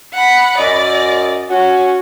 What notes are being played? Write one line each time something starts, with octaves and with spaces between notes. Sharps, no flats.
F#5 B5
F#2 D5 D#5
C#4 F#4